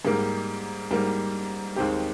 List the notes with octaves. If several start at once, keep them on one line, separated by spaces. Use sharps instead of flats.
G#2 G3 A#3
G#2 G3 A#3
D#2 D#3 G#3 C4 G4